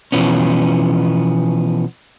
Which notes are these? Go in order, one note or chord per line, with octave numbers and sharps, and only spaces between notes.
B2 E3 F3 B3 C#4